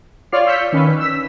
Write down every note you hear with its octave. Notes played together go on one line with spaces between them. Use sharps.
F4 C#5 D5 F6 C7
E6 G6 B6 C#7
D#3 C#4 B4
E6 B6